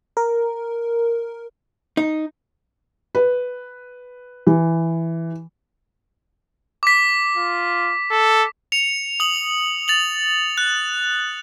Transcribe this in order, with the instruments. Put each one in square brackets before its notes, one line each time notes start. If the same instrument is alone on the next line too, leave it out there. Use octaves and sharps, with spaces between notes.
[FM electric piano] A#4
[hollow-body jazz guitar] D#4
[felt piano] B4
E3
[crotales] D6 B6
[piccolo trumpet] F4
A4
[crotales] C#7 F7
D#6 F#7
A6 F7 F#7
F#6